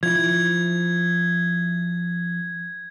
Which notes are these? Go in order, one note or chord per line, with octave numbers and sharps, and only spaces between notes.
F3 E4 G#6